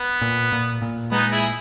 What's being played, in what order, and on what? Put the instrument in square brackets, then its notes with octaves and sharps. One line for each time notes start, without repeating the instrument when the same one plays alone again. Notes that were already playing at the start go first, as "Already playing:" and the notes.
Already playing: [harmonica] B3
[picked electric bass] A#2
A#2
A#2
[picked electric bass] G#3 [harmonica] B3 D#4
[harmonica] E4 G#4